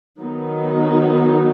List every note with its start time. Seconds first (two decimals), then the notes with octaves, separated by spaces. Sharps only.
0.20 D#3 F#3 B3 D#4